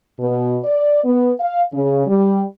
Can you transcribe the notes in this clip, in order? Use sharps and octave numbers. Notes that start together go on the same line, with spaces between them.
B2
D5
B3
F5
C#3
G3